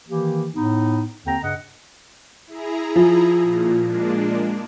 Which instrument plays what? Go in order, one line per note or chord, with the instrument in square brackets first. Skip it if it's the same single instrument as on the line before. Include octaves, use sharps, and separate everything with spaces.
[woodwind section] D#3 E3 A#3 G4
A2 B3 D#4
D#2 D3 C4 G5 A#5
G2 C#3 D#5 F#5
[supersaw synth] E4 G#4 A#5
[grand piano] F3
[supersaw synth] A#2
G#3 A#3 D4